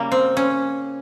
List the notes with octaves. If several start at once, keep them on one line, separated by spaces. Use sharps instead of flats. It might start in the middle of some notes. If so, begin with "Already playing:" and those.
Already playing: C#3 G3 A#3
C4
C#4